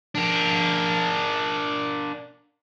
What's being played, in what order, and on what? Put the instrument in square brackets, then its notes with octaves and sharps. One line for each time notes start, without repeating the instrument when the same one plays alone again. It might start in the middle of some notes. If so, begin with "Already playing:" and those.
[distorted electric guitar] D4 A#4